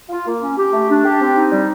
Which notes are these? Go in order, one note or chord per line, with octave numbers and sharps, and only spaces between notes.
F4
A#3
C#4
G4
A3
D4
G4
C4
D#4
G3